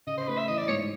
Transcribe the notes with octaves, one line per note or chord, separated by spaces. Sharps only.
C#3 D#5
C5
A3 B4
E5
E3 D#5
D5
G#2 C#5